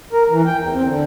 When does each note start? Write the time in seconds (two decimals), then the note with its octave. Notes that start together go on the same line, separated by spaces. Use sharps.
0.13 A#4
0.30 E3
0.46 G5
0.60 E2
0.73 C4
0.86 D3